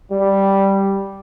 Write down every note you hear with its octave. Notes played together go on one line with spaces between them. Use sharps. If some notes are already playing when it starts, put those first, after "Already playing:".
G3